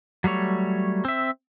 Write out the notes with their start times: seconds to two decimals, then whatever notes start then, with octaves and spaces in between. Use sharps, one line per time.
0.24 F#3 G3 A3 C#5
1.05 C4 E5